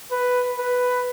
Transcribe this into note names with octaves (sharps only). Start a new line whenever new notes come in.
B4
B4